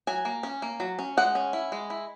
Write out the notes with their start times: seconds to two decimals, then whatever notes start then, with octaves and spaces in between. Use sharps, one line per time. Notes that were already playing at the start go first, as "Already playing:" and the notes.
0.07 F#3 G#5
0.25 A#3
0.43 C#4
0.62 A#3
0.80 F#3
0.99 C#4
1.17 G#3 F#5
1.35 C#4
1.53 E4
1.72 G#3
1.90 E4